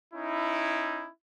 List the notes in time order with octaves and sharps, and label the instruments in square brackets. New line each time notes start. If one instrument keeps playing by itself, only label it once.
[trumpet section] C#4 D#4 E4